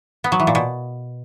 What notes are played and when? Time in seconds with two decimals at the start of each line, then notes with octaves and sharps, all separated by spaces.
0.24 B3
0.32 F#3
0.40 E3
0.47 A#2
0.55 B2